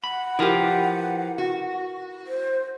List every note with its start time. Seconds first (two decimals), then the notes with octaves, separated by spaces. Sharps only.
0.04 F#5 B5
0.39 F3 E4 G4 A#4 B4
1.38 F#4
2.27 C5